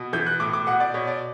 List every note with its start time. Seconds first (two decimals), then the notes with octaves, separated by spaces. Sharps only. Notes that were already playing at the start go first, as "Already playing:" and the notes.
Already playing: B2
0.13 E3 G6
0.26 F#6
0.40 A2 D6
0.53 D6
0.67 B2 F#5
0.80 D5
0.94 B2 C#5
1.07 D5